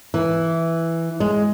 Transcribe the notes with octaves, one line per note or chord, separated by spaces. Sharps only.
E3
G#3